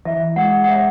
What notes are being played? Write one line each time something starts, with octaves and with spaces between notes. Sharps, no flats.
E3 E5
G#3 F#5
F#5
C#5 E5